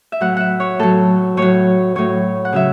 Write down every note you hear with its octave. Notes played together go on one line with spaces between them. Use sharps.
E5
A2 F#3 F#5
E5 F#5
C#5
A2 F#3 A4
A2 F#3 C#5
A2 F#3 C#5
F#5
C#3 F#3 E5